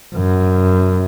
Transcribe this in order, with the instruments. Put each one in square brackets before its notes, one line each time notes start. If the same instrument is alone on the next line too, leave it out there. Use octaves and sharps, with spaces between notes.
[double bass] F#2